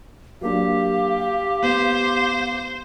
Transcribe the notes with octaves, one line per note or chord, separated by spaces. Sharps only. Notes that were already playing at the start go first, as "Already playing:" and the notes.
F#3 A#3 D4 G4 F5
B3 C5